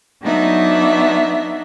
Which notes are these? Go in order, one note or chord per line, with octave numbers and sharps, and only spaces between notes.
F#3 B3 D4 D#4 E5